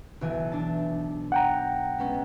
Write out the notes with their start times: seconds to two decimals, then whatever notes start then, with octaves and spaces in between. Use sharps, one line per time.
0.21 B1 E3 G#5
0.52 D4 A5
1.32 F#5 G5 A#5
1.98 G#3 B3 C#4